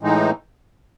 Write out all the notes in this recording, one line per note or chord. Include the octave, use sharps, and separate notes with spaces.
A2 E3 G#3 D#4